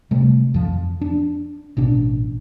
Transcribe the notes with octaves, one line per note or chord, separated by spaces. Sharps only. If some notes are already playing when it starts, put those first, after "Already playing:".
C3 G3 A3
F2 F3
D4
A1 B2 D4